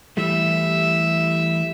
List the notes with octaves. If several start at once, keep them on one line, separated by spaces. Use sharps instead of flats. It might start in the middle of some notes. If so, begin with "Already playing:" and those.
E3 G3 A3 E5